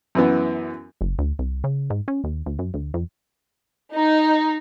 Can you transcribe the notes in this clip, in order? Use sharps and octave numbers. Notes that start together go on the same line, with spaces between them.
F#2 E3 B3
F#1
D2
C2
C#3
G#2
C#4
D#2
D2
F#2
D2
F2
D#4